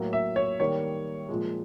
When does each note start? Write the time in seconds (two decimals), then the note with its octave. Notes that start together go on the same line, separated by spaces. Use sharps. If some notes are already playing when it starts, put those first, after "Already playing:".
Already playing: A2 F#3 A#3
0.13 E5
0.36 C#5
0.60 D#3 G3 A#3 C#5
1.29 A#2 F3 G#3